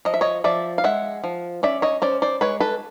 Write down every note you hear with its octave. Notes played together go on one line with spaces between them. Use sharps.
F3 D#5
E5
C#5 D#5
F3 D5 E5
F5
G#3 E5 F#5
F3
C#4 D5 E5
C#5 D#5
C#4 C5 D5
C5 D5
G#3 B4 C#5
A4 B4